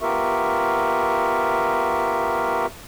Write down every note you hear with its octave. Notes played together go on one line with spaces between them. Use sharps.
B3 F4 G4 A#4 E5 C#6